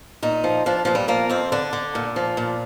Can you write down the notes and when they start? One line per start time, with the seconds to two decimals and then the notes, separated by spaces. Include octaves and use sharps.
0.23 A#2 D#4
0.44 F3
0.66 F3 D4
0.85 A#2 F3
0.95 G3
1.08 F3 A#3
1.29 F2 C4
1.52 D3 D4
1.73 D3
1.95 A#2
2.16 F3
2.37 A#2